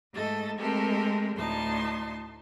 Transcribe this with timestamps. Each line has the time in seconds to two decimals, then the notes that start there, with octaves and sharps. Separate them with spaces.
0.13 G#2 A3 A4 D#5 A6
0.57 G#3 A3 C4 G4 A4 A#4
1.36 D2 A2 D#4 A5 C6